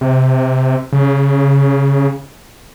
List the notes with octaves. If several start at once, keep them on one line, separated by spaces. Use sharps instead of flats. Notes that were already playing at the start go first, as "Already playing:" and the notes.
C3
C#3